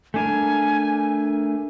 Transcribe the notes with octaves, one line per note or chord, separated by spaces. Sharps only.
A3 D4 A#4 G#5